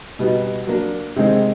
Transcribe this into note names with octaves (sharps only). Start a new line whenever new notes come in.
B2 G3 B3 D#4 F#4
F#3 A#3 D4
C3 D#3 G#3 C4